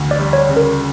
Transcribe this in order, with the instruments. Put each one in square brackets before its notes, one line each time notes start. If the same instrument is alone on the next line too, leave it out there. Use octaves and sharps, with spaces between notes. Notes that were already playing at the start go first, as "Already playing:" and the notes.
Already playing: [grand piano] D2
[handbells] D5
[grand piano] G3
[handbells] C#5
[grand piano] C#3
[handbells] A#4